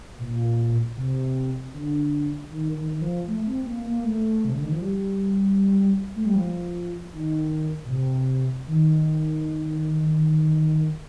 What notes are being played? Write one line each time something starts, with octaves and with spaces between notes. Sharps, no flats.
A#2
C3
D3
D#3
D#3
D#3
F3
A3
C4
A#3
A#3
A3
C3
D3
D#3
F3
G3
A3
G3
F3
D#3
A#2
C3
D#3